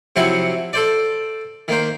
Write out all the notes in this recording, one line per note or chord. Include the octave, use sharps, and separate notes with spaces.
C3 F3 F#3 C4 E4 F#5
A4 C5 D5
D#3 A#3 C5